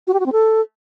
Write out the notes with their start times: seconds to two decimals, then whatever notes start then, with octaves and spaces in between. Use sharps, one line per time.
0.07 F#4
0.14 G4
0.20 F#4
0.26 C4
0.32 A4